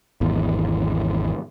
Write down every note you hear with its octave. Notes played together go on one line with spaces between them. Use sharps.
G#1 E2